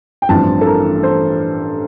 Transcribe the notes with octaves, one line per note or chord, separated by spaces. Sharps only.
G5
A1 G2 F3 C4 A5
A4
A#4
C5